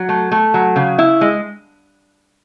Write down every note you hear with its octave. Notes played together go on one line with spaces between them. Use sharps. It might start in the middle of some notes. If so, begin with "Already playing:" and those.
Already playing: F#3
A3
A3
F#3
C#3
E4
G#3